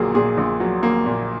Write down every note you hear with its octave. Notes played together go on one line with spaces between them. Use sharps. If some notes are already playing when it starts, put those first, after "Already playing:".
Already playing: A#1 A#2 F#3 A#3 G#4
A#2 G#4
A#1
F#3
A#3
A#2